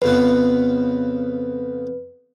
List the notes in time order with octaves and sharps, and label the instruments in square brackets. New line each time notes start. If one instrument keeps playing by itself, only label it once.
[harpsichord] F2 C#3 B3 [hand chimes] B4